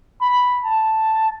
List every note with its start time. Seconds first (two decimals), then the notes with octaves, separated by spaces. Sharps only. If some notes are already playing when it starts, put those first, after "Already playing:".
0.21 B5
0.64 A5